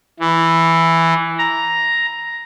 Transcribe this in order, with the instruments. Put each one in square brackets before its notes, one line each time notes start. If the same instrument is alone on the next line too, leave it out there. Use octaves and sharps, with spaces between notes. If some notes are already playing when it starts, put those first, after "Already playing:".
[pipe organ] E3
A#5